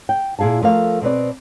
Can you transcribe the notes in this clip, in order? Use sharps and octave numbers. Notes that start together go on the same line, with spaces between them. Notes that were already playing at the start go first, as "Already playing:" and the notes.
G5
A#2 E4 G#4 F5 A5
F3 A3 A#4 F5
B2 C4 B4 D5